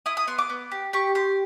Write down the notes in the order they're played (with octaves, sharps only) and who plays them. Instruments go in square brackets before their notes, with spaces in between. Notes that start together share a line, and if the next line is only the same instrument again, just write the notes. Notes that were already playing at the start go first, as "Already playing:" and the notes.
[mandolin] E4 D#6
D#6
B3 C6
D6
B3
G4
G4 C#6
G4 C6